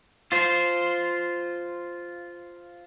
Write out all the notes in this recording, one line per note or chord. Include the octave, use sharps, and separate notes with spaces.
F4 C5